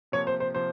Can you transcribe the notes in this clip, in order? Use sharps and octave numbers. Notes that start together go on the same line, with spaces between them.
C3 F3 A#3 C#5
C5
C5
C3 F3 C5